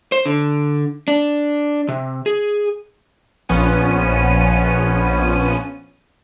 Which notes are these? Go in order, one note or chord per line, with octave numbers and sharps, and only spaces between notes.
C5
D3
D4
C3
G#4
A#1 F3 B3 C#4 D#7